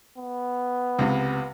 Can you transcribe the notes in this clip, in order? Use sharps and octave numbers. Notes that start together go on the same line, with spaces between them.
B3
C#2 C3